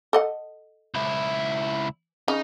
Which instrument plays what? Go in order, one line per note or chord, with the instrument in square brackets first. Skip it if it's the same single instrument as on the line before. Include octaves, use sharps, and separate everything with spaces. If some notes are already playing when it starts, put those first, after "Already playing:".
[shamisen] A4 D#5 F#5
[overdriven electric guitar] C#2 E4
[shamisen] C#3 [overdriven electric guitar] D#4